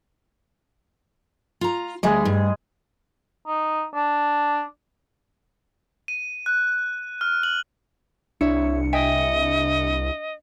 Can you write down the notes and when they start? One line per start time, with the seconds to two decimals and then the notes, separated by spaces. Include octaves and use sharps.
1.61 F4 A#5
2.03 D2 G3 G#3 G#4 D#5
2.25 G2
3.47 D#4
3.94 D4
6.08 D#7
6.46 F#6
7.21 F6
7.43 F#7
8.41 C2 D4 E4 C#5 C#7
8.93 D#5 E5 G5 G#5